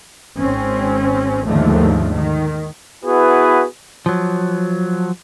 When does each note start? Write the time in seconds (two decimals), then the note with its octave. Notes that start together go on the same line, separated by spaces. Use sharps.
0.38 G#1 C4 C#4
1.47 D#2 G#2 D3 D#3 F3 A3
2.11 D#3
3.04 B3 E4 F#4 G#4 B4
4.06 F3 F#3